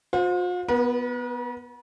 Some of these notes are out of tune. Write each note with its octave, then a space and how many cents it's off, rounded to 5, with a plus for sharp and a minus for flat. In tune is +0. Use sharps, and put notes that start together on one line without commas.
F4 +45 C5 +0
B3 +0 B4 -45